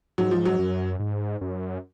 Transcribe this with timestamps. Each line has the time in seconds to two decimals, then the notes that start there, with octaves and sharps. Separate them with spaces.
0.18 G#2 F#3
0.31 F3
0.45 F#3
0.59 F#2
1.00 G#2
1.41 F#2